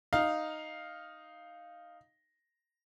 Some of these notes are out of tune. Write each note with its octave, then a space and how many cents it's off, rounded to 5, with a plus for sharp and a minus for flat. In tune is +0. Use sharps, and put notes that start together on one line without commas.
D#4 -5 F5 +0